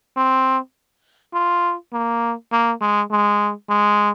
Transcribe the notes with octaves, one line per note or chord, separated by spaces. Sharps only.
C4
F4
A#3
A#3
G#3
G#3
G#3